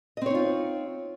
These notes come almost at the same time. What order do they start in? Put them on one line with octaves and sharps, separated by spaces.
D#5 C4 C#5 D#4 F4